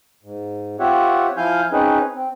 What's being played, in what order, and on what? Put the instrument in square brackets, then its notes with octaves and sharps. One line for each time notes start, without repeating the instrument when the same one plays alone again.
[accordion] G#2
C4 F4 G4 C#5 E5 F#5
F3 E4 F5 G#5 F6 G6
C4 C#4 D#4 G#4 B4
C4